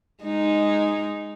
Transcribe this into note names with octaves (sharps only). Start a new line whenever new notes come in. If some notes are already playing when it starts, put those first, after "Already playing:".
G#3 D#4